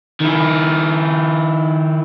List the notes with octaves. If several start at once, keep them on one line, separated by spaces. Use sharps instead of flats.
D#3 E4